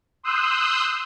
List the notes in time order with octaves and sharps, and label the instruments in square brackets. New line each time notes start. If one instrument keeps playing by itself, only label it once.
[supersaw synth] C6 D#6 E6 F#6 G6